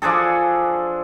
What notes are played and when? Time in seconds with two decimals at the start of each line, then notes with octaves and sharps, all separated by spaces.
0.02 F3 D4 G#4 A4